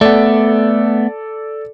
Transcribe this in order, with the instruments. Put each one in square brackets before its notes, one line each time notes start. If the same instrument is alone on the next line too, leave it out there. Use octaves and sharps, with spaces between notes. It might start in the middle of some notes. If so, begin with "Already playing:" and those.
[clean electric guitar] A3 B3 [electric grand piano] A4 D5